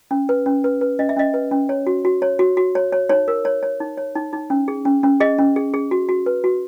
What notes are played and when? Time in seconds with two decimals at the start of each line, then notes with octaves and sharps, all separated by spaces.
0.11 C#4
0.29 B4
0.46 C#4
0.64 B4
0.81 B4
0.99 C#4 D#5
1.09 E5
1.17 C#4 D#5
1.34 B4
1.51 C#4
1.69 C#5
1.87 F#4
2.05 F#4
2.22 C#5
2.39 F#4
2.57 F#4
2.75 C#5
2.92 C#5
3.09 D#4 C#5
3.28 A#4
3.45 C#5
3.63 C#5
3.80 D#4
3.98 C#5
4.15 D#4
4.33 D#4
4.50 C#4
4.68 G#4
4.85 C#4
5.03 C#4
5.20 G#4 D#5
5.38 C#4
5.56 G#4
5.74 G#4
5.91 F#4
6.09 F#4
6.26 B4
6.44 F#4